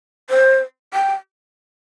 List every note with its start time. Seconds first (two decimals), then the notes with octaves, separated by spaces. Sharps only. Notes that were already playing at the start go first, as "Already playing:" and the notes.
0.30 C5
0.94 G5